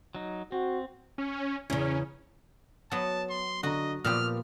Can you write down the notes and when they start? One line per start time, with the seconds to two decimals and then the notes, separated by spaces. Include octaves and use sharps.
0.15 F#3 D#4
0.52 C4 F#4
1.18 C#4
1.70 E2 C#3 C#4
2.91 F#3 B3 A5
3.30 C6
3.63 D3 F#4 D#5 A#5
4.04 A#2 F3 B3 G4 F6